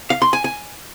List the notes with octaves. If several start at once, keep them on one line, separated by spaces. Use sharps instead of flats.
F5
C6
G#5
G#5